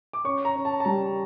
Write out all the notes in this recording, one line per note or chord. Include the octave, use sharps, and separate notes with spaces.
D6
C#4 C#6
A#5
C#4
A5
A5
G3 A#5